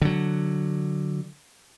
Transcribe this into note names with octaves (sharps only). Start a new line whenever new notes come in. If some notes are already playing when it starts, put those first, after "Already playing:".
D3 F#3